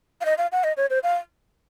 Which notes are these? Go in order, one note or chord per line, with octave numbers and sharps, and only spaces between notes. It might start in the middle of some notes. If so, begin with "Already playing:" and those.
F5
D#5
F5
F#5
D#5
C#5
C5
F5